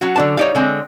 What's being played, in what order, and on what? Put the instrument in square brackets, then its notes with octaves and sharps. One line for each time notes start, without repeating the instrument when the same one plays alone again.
[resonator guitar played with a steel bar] F#3 C#4 F#4
[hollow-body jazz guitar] D3 D4 A5
[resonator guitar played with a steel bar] G3 D#4 [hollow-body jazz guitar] C#5 D5 F5
[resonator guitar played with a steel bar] D3 G#3 C4